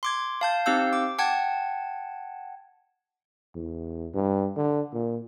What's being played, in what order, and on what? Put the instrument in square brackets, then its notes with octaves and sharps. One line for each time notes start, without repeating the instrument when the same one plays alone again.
[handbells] C6 D6 G#6
F5 A5 G6
C4 D#4 G4 F5 E6 G6
D6
F#5 G5 A5 G#6
[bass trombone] E2
G2
D3
A#2